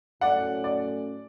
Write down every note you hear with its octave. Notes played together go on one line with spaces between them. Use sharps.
A2 F#3 A3 C#4 D5 F#5
D5